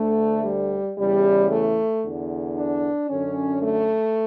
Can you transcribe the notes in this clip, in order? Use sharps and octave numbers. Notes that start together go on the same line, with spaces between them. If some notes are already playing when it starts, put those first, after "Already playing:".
Already playing: D2 D3 A3
G3
E2 C#3 E3 G3
A3
E2 D3
D4
F#2 D3 C#4
A3